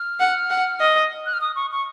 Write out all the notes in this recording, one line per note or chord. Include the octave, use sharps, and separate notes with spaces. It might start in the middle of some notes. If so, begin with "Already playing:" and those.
Already playing: F6
F#5
F#5
D#5
F#6
F6
D#6
C#6
C#6